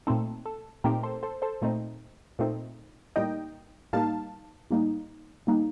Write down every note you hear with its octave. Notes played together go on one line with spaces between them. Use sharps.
A#2 A3 C4 D#4 A4
A4
A#2 A3 C4 D#4 G4 A#4
A4 C5
A4 C5
A4 C5
A#2 A3 C4 D#4
A#2 A3 C4 D#4
A2 G3 A#3 D#4 D#5 G5
A2 G3 A#3 D#4 F5 A5
A2 G3 A#3 D#4
A2 G3 A#3 D#4